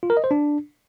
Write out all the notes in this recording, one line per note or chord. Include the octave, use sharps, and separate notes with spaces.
F4
A#4
D#5
C5
D4